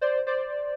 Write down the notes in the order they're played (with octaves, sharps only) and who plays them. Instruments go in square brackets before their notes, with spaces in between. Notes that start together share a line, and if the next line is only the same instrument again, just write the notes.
[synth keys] C5 D5
C5 D5